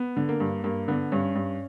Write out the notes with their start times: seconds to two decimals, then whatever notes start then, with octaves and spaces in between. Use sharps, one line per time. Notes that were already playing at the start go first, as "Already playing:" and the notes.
Already playing: B3
0.17 D3
0.29 A#3
0.40 G2
0.64 G2 A#3
0.88 D3 B3
1.12 G2 C#4
1.35 G2